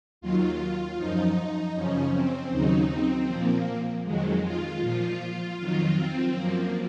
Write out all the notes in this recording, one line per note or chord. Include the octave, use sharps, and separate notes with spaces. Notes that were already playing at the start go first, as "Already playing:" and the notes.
D#2 D#3 F#3 F4
F#2 F3 D#4
F#2 C#3 F3 C#4
C4
D#2 C#3 F#3 D#4
C4
A#2 F3 A#3
F2 D#3 F#3 G#3
F4
A#2 F3 F4
F2 D#3 F#3 F4
C4
F#2 F3 A#3